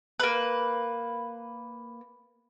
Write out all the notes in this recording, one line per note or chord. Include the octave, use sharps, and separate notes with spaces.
A#3 B4